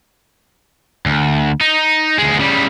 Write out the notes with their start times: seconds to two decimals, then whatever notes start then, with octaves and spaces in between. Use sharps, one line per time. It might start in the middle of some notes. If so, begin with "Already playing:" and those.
1.06 D2
1.61 D#4
2.18 D2 G#3
2.39 C#3 G3